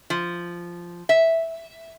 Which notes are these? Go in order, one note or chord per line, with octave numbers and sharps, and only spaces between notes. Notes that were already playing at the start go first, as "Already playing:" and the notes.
F3
E5